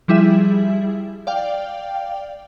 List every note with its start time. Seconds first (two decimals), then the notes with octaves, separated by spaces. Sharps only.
0.08 F3 G3 E4 G#4 E5
1.27 D5 F5 G5